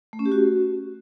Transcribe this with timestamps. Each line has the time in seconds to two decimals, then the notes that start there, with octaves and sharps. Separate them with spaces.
0.13 A3
0.19 C#4
0.25 G4
0.32 F#4